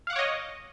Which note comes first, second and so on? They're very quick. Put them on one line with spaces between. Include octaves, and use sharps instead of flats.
F5 F#5 D6 C#5 D#5